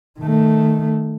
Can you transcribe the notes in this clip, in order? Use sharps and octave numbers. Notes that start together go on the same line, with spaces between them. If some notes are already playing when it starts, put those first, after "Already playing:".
D#3 A3